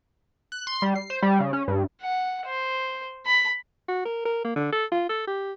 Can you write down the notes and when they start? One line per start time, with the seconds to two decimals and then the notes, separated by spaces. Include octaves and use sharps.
0.52 F#6
0.67 C6
0.82 G3
0.96 C7
1.10 C5
1.22 G3
1.40 C#3
1.53 C#4
1.68 G2
2.02 F#5
2.46 C5
3.26 B5
3.88 F#4
4.05 A#4
4.25 A#4
4.44 A#3
4.56 D3
4.72 A4
4.91 F4
5.09 A4
5.27 G4